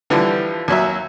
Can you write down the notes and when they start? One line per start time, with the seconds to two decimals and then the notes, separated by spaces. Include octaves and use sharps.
0.10 D3 E3 F3 G3
0.68 D#2 F#3 E5